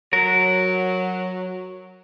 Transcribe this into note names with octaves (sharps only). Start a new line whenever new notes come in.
F#3 A#4